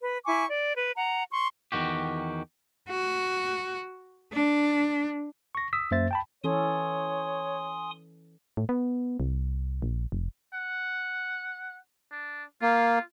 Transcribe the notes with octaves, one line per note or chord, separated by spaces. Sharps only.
B4
E4 G#5 C#6 D6
D5
B4
F#5 A#5
C6 C#6
E2 B2 D#3 F#4 G4
F#4
D4
C#6 A#6
D#6 E6 B6
F#2 A#3 C5 E5 A6
G5 A5 B5
E3 C#4 A4 C#5 G#5 C6 D#6
A2
B3
C2
A#1
F1
F#5
D4
A#3 F4